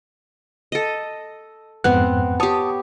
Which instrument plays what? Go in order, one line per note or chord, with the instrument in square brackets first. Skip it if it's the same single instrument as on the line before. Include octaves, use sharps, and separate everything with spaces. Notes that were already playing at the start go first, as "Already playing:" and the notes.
[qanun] A4 D#5
[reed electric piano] F2 G#2 F#6 [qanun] B3 C4
[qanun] G4 C#5 [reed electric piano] A5 D#6